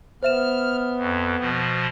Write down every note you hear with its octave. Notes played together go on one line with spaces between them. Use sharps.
B3 C5 E5 F6 E7
F2
B2 F3